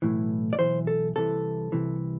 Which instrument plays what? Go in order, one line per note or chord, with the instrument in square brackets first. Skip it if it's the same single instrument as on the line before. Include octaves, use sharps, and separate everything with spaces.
[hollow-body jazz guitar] B1 A2 E3
D5
B1 A2 E3 C5
A4
C2 C3 E3 A4
C2 C3 E3